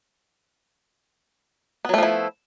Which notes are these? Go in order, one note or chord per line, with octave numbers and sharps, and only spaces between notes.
F3 F#3 A3 B3 E4